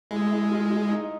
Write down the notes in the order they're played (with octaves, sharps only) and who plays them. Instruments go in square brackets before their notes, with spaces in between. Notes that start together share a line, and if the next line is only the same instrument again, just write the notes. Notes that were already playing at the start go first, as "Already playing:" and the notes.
[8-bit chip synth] G#3 [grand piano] E4
[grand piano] E4
F4
F4
D#4